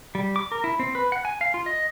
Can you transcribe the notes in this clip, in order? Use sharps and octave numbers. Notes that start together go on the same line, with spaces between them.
G3
D6
A#4
E4
C4
B4
F#5
G#5
F5
F4
D#5